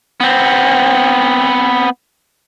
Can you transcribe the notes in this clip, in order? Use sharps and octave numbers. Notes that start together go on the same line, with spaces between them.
B3 C4